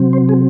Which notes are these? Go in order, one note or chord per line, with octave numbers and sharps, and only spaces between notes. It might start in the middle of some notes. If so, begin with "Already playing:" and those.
Already playing: C3 F#3 C4
C5
G#4